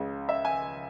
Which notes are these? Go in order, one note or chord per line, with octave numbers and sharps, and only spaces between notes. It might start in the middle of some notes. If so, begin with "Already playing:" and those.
Already playing: C#2 C#3 G#3
E5
G#5